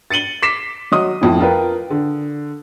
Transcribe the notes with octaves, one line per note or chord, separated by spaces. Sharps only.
A6 C#7 D#7 F#7 G7
D6 B6 C7 E7
F#3 D#5 D#6
F2 A2
F4 A#4 B4 G5
D3